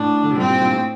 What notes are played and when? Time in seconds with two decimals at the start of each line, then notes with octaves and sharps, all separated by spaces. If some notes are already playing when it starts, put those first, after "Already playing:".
Already playing: A2 D4
0.23 D3
0.30 C3
0.37 G2 A#2 C4
0.49 G2 A#2
0.61 G2 A#2
0.72 A2